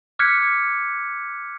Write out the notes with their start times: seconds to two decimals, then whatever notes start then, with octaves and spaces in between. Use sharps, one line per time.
0.19 D6 F6 F#6 G#6 B6 C#7